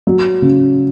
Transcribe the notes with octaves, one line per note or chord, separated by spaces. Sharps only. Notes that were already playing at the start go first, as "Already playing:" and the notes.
F#3
C#3